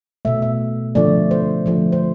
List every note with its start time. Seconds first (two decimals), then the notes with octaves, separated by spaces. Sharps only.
0.25 B2 A3 E5
0.42 E5
0.95 D3 F3 A3 D5
1.31 C5
1.66 D3 F3 A3
1.92 C5